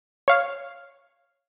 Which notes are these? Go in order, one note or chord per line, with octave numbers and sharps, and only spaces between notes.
C#5 F5 F6